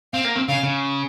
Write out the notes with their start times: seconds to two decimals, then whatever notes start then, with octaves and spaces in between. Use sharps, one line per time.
0.13 C4 F5
0.25 A#3
0.35 C4
0.49 C#3 F5
0.63 C#3